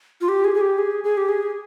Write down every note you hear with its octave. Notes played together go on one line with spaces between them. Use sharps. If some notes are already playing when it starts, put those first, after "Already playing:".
F4
G4
G#4
G#4
G4
G#4
G#4
G4
G#4